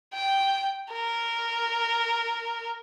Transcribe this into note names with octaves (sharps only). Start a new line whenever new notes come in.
G5
A#4